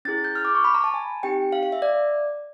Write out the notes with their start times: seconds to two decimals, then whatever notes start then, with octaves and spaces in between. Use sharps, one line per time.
0.05 C#4 E4 G#4 A6
0.24 G6
0.35 F6
0.45 D6
0.55 C#6
0.64 B5
0.74 A#5
0.84 A5
0.94 G#5
1.23 C4 D#4 G4 G5
1.52 F5
1.63 F5
1.72 E5
1.82 D5